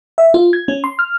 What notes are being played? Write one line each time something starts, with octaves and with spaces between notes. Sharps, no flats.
E5
F4
G#6
C#4
C6
F6